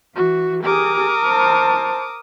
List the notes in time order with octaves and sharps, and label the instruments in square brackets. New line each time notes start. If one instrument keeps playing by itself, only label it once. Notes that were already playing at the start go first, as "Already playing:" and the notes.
[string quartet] E3 F#4
[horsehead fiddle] G4 G#4 [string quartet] A#4 D6 D#6
[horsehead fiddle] C5 A5